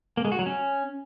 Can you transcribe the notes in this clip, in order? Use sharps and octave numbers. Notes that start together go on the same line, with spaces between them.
A#3
G#3
F#4
F#3
C#4